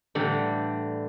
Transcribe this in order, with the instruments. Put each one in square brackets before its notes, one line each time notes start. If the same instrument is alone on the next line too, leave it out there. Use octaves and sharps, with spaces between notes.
[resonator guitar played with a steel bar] A2 D3 E3 G3